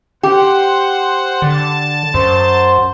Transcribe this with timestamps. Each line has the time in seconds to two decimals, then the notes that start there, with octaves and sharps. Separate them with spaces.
0.23 G4 C5 F#5
1.42 D3 A5
2.14 F#2 C5